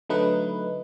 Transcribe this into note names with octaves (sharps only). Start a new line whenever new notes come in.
D3 F#3 A3 D#4 B4